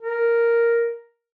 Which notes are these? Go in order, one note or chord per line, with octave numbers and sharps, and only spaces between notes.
A#4